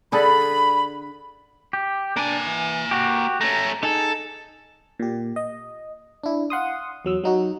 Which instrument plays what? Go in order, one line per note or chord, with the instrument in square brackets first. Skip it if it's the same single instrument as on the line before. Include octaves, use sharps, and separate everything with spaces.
[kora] D3 G#4 A4 [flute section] B5
[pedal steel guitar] G4
[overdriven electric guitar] A#3 G#5 [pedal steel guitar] D4
[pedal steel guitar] E3
F#4 G4
[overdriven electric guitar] A3 C#4 [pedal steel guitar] A#5
[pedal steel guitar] D#4 G#4 [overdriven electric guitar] A4
[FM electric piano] A#2 G4
D#5
D4 E4
F5 F#5 C6 D#6
E2 F#3 E6
F#3 D#4 F#4